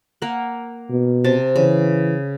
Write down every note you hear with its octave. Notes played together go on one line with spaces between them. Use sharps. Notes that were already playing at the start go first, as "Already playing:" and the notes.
A#3 F#5
B2
C3 A5
C#3 E3